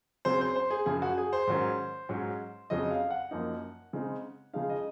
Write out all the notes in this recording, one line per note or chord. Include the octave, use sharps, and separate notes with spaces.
C#3 F#3 C4 C5
C5
C5
G#4
F#2 C#3 F3 G#4
F#4
G#4
C5
G#2 D#3 F#3 C#4
G#2 F#3 C#4
F2 C#3 F#3 D#5
F5
F#5
F#2 F3 A#3 D#4
C#3 G#3 C4 D#4
C#3 F3 G#3 D#4 F5
D#5